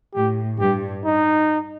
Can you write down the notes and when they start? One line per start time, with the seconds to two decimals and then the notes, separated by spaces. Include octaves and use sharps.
0.15 A2 G4
0.60 G2 G4
1.05 D#4